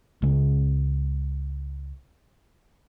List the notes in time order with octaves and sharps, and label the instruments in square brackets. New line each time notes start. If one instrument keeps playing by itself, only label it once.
[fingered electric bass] C#2 C#3 G#3